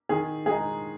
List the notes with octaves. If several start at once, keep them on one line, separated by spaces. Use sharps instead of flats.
D#3 G#4
G#3 D#4 G#4